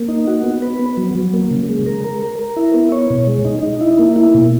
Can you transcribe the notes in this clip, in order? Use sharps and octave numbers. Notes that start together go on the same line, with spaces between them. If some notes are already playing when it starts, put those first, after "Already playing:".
Already playing: A#3
D#4
F#4
B3
B4
B3
F#3
F#3
A#3
C#3
G#3
A#4
A#4
A#4
A#4
E4
B3
C#5
B2
G#3
D#4
D#4
E4
A#3
E4
B2